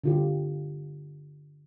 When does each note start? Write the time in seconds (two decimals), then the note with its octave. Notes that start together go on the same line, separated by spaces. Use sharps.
0.04 D3 F4 G4